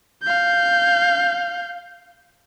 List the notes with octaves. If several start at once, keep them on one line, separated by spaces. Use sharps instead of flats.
F5 G6